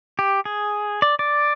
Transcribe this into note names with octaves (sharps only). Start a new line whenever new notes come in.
G4
G#4
D5
D5